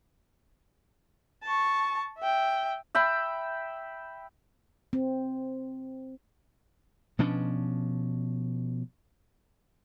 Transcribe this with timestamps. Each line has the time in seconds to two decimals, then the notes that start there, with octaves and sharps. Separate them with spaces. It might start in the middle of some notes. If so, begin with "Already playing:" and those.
1.44 A5 C#6
2.19 E5 G5
2.95 E5 G5 B5
4.93 C4
7.19 B2 F3 C#4 D4